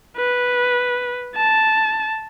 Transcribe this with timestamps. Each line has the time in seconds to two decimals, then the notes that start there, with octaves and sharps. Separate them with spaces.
0.17 B4
1.36 A5